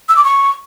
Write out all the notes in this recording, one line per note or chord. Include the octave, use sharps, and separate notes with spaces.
E6
D6
C#6